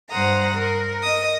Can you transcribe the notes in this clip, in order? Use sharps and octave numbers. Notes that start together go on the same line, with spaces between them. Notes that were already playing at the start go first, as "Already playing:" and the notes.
G2 C5 F#5 A#5 D#6
A#4
D#5 D#6